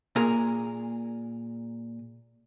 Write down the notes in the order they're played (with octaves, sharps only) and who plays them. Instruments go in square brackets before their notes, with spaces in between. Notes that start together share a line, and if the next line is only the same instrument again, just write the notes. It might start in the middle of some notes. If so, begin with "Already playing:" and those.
[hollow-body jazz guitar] A#2 G#4 A#4 A#5